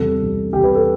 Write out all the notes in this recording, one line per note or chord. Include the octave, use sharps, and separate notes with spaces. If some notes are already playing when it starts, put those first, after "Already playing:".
Already playing: E2 C3 G3 A4
E2 C3 G3
E2 C3 G3 G4
B4
A4